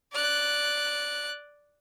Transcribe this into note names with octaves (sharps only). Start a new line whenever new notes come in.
D5 F#6